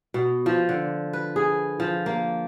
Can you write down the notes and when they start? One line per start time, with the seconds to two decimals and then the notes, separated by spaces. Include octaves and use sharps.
0.14 B2
0.46 F3
0.69 D3
1.13 B4
1.36 G#4
1.80 F3
2.06 A#3